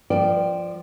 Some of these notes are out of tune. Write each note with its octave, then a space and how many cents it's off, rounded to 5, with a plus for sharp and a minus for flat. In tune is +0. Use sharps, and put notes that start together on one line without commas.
F3 -5 D5 +15 G5 -10